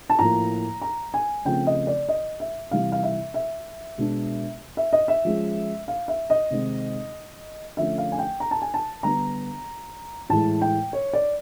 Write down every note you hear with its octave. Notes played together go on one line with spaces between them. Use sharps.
A5
A2 F3 A#3 A#5
A#5
G#5
C#3 F3 A3 C4 G5
D#5
D5
D#5
E5
C3 E3 G3 F5
F5
E5
E5
B2 G#3 B3 D4
E5
D#5
E5
F3 G#3 C#4
F5
E5
D#5
C3 D#3 G#3 C4 D#4
D3 F3 A3 C#4 E5
F5
G#5
G5
A#5
A5
G#5
A5
D3 G3 B3 D4 A#5
A2 E3 G#3 A5
G5
C#5
D5